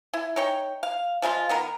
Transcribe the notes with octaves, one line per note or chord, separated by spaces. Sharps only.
E4
D#4 C#5 G5
F5
F3 G#3 E4 F4
D#3 B3 A#4